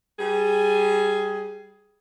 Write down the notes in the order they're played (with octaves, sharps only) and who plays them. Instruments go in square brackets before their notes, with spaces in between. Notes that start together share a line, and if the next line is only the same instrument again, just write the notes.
[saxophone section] G3 G#4